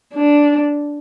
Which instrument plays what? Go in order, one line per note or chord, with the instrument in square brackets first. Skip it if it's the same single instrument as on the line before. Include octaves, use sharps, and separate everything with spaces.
[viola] D4